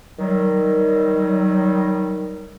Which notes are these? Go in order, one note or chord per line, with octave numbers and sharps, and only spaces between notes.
D#3 F#3 G3